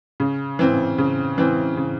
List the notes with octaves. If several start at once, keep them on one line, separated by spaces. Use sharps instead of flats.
C#3
E3 C4
C#3
E3 C4
C#3